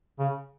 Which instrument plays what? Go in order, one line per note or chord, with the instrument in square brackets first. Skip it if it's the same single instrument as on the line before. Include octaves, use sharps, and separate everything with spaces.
[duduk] C#3